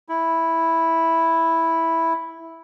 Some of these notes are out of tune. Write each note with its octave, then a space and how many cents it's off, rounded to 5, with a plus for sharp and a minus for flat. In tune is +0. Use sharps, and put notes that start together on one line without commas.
E4 -5